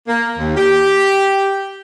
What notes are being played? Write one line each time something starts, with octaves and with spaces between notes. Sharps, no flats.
A#3
D#2
G4